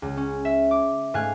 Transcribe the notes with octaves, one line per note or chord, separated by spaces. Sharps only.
C#2
C#4
E5
D6
G#2 A3 F5 G#5 F#6 G#6